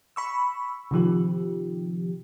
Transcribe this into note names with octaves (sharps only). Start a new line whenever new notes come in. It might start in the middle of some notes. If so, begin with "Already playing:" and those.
B5 C#6 E6
C3 D#3 F3 G4